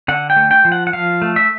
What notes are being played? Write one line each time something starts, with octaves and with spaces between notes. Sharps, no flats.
D3 F#5
G5
A3
G5
F3
F#5
F#5
F3 F5
A3
E5